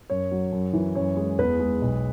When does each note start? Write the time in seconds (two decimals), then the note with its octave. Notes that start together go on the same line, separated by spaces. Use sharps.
0.10 F#2 C#5
0.31 F#3
0.52 F#2
0.73 E3
0.95 F#2 C#5
1.17 G#3
1.38 E2 B4
1.59 G#3
1.82 B1